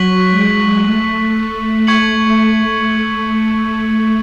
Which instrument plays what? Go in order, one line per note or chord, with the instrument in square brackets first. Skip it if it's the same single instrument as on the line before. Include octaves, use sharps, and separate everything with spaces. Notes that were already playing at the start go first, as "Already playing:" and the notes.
Already playing: [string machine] F#3 [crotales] C#6 F#6 B6 F#7
[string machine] G#3
A3
[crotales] C#6 G#6 C#7 F#7